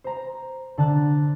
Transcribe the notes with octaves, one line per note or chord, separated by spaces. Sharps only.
C5 A#5
D3 D4 A5 F#6